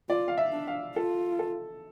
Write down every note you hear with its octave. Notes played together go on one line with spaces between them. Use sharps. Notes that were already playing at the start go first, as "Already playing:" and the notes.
F4 D5
F5
E5
D4
F5
F4 A4
A4